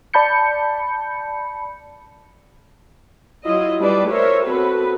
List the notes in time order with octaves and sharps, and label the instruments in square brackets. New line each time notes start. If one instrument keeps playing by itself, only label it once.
[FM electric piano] D5 A5 B5 G6 C#7
[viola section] F#3 E4 F4 D#5
G3 D4 B4 D5
A#4 C5 C#5 E5
B3 C4 F#4 A4 B4